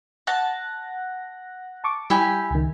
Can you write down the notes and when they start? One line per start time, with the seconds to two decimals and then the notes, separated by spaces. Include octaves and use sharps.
0.27 F#5 A5 F#6 A#6
1.84 A5 C#6 D6
2.10 G3 E4 G4 G#5
2.50 C#2 D#3